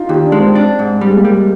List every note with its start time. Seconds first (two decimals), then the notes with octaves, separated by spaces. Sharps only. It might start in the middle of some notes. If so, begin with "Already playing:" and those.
Already playing: D#4 F4
0.09 D#2 G4
0.25 D4
0.32 G#3
0.40 C4
0.55 D4
0.79 G#2
1.01 G3
1.10 G#3
1.17 A#3
1.25 G3
1.33 G#3